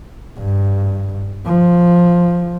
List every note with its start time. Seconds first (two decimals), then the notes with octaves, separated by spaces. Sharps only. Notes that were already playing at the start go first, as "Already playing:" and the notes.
0.38 G2
1.46 F3